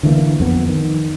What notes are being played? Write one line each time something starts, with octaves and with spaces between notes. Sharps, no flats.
D3 E3 G#3 A#3
F2 B3
D#3